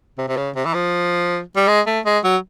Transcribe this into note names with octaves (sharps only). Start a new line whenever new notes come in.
C3
C3
C#3
C3
E3
F3
G3
G#3
A3
G#3
F#3